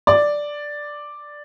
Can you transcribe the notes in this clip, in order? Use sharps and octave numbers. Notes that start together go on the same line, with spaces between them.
D5